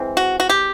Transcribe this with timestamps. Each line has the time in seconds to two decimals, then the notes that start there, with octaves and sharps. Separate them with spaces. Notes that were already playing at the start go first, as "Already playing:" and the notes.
Already playing: E3 G#3 C4
0.17 F#4
0.40 F#4
0.49 G4